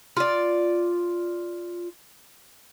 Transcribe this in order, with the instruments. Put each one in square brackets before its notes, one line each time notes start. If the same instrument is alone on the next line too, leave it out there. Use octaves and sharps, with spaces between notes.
[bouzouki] F4 D5